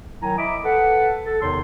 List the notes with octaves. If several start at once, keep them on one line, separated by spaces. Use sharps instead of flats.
D#3 F#3 E4 G#5 A#5
D#5 E5 B5 D6
A4 B4 F#5
A4
E2 C3 D#3 D#4 C#5 C6